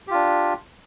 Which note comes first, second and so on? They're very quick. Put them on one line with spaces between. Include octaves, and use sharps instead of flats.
G4 F4 D4